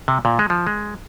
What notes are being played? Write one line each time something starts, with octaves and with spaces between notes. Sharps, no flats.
C3
A#2
G#3
F3
G#3